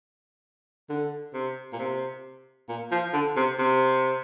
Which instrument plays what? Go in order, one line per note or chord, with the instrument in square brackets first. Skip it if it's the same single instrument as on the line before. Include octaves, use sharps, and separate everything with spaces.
[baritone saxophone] D3
C3
A#2
C3
A#2
F3
D3
C3
C3